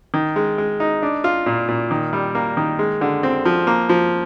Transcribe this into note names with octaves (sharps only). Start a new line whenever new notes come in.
D#3
G#3
G#3
D#4
D4
F4
A#2
A#2
D#3
G3
A#3
D#3
G#3
D3
C4
F3
A#3
F3